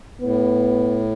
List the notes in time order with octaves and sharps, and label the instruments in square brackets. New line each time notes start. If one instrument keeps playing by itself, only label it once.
[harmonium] A2 [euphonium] B3